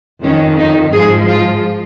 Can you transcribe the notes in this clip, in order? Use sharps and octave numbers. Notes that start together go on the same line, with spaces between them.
F2 D#3 C#4
D#4
G#2 F3 G#4
F4